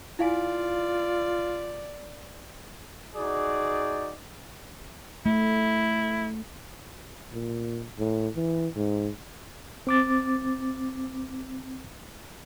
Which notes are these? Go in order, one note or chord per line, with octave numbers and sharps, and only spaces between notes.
E4 F4 D5 F5 G#5
D#4 F#4 G#4 D5
A3 E4
A#2
A2
E3
G#2
C4 D6 A6